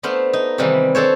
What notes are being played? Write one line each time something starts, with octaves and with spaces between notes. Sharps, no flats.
A3 B3 D4 C5 F5 C6
D#4
C3 D#3 E3 G3 A#3 B3
D4 A4 C5 C#5